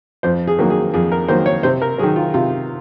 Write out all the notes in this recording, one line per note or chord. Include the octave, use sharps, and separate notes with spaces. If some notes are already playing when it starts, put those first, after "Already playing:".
F2 C5
G#4
D#3 F#3 A#3
G#4
F2 G#4
A#4
D#3 F#3 A#3 C5
C#5
C3 C5
A#4
D#3 F#3 G#4
F4
C3 F4